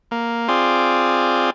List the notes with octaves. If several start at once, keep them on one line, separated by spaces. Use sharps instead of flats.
A#3
C4 F4 G#4 D5